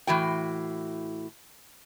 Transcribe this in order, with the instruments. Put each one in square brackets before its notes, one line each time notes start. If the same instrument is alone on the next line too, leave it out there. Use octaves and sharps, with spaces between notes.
[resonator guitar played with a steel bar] A2 E3 F#4 G5